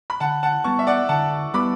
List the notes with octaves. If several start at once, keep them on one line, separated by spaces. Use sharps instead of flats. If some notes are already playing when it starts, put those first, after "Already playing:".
B5
D3 F#5 A5
F#5 A5
G3 B3 A5 C#6
E5
D5 F#5
D3 F#5 A5
G3 B3 B5 D6